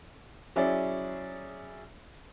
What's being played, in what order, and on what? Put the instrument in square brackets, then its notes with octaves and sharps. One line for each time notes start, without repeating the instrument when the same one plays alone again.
[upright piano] F#3 C#4 E4 G#4 D5